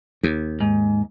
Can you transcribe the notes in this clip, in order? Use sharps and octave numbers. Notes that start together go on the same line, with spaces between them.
D#2
G#2